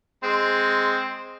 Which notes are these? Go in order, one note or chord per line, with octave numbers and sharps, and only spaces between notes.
G#3 C4